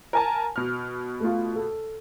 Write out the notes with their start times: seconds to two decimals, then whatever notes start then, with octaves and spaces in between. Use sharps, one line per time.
0.13 A#4 G#5 A5
0.56 B2 F6
1.20 A3 F4
1.56 A4